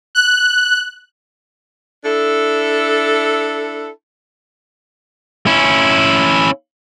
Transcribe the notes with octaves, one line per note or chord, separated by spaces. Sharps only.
F#6
D4 E4 A4
C#4 E4